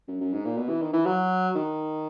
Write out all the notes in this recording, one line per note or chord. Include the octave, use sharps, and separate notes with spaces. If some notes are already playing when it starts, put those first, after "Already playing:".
F#2
F#2
G#2
A#2
B2
E3
D#3
E3
F#3
D#3